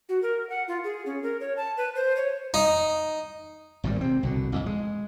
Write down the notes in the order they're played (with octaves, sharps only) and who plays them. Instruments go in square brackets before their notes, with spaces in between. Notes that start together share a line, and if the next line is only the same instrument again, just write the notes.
[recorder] F#4
A#4
F#5
F4
G#4
C#4
A#4
C#5
A5
B4
C5
C#5
[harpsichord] D#4
[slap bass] G#1 A#2 C#3 G3
C3 C4
C2 B2 D3
A1 F2
G#3